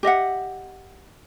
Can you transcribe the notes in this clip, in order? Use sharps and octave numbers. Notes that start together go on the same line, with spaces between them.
G4 D#5 E5 F#5